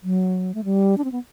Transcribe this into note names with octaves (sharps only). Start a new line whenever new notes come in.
F#3
A3
G3
D4
C4
B3